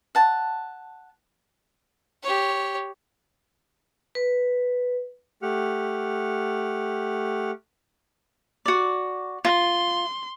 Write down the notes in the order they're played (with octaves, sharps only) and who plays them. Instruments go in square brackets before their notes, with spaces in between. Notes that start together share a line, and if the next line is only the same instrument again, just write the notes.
[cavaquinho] F#5 A5
[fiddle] G4 C#5
[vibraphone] B4
[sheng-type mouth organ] A3 G4 F#5 F6
[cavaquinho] F#4 D5
[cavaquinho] F4 [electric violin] C6